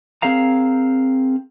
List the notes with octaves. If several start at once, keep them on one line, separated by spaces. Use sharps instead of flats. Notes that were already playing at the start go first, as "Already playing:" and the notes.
C4 G#4 A#4 F5 A#5